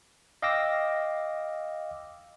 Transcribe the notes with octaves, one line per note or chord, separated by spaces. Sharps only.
D#5 F5 G5 D6 E6 A#6